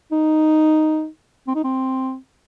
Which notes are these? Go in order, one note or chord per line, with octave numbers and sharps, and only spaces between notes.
D#4
C4
D#4
C4